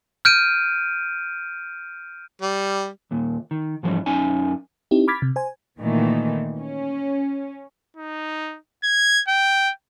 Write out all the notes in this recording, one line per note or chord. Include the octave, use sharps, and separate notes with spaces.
F6 G6 D7 D#7
G3
D#2 A#2
D#3
G#2 E3 F3 G3 C#4
F#2 C#4 D#4 G#5
C4 D#4 E4 G4
B5 D6 F6 G#6 A6 B6
C3
C5 G#5
A#2 D#3 E3 A3 B3
C#4
D#4
G#6
G5